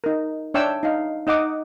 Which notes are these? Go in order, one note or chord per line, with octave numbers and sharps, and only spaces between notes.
D#4 A#4
D4 C#5 E5 G5 E6
D#4 F5
D#4 D#5 F#5 D6 D#6